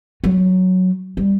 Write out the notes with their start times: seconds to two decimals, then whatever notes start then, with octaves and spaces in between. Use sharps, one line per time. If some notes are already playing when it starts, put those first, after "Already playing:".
0.24 F#3
1.17 G3